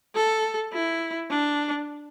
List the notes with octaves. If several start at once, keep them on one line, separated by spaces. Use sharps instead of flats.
A4
E4
D4